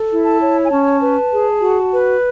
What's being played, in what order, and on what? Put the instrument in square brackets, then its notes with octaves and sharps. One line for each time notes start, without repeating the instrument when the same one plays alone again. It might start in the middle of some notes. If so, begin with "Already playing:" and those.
Already playing: [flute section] A4
E4
A5
C#5
G#5
C#4 A5
B4
G#4
F#4
B4